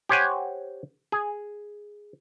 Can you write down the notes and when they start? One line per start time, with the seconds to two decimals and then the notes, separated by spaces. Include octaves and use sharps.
0.09 G4 C5 C#5 F#5 G#5
1.12 G#4